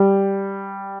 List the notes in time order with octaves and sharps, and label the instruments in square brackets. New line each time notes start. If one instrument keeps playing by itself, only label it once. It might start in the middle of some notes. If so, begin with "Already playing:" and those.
Already playing: [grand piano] G3